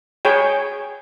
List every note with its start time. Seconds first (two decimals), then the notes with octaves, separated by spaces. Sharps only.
0.25 G#4 C#5 G5